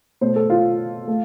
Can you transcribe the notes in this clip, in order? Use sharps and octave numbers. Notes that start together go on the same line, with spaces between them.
B2 A3 C5
A4
F4
A3